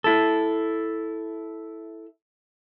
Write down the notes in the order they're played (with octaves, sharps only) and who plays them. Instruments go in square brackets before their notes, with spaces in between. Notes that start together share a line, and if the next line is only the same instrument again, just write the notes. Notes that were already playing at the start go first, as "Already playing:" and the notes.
[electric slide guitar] E4 A4